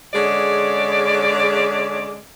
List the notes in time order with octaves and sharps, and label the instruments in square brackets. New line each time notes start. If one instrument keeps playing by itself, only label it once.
[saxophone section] D3 G#3 C#4 G#4 D5